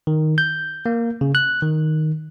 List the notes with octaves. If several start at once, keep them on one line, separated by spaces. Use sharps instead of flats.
D#3
G6
A#3
C#3
F#6
D#3